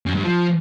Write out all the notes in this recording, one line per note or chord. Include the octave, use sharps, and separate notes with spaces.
F#2
G2
F3